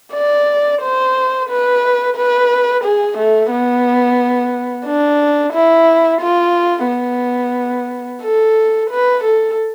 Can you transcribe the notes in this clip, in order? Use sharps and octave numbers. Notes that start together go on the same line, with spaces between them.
D5
C5
B4
B4
G#4
A3
B3
D4
E4
F4
B3
A4
B4
A4